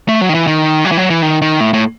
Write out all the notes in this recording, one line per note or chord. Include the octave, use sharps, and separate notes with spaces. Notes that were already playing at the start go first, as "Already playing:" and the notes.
A3
F#3
D#3
E3
D#3
F#3
E3
F#3
E3
D#3
D#3
A2
A2